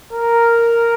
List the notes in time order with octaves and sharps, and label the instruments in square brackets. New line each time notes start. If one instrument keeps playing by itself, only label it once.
[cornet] A#4